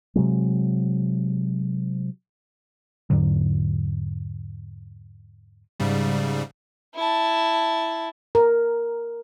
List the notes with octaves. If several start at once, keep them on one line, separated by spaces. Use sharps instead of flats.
C3 F#3 G#3
E2 G#2 D3 F#3
G#2 C#3 G3
E4 A5
A#4